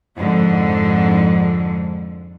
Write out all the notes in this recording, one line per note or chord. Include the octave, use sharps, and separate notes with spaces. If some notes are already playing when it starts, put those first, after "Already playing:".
F2 G#2 D3